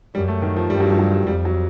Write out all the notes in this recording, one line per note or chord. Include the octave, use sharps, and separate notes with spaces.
F#2 G3
A3
D#3
F3
G2 G3
F#3
F3
F#3
F2 G3
F#3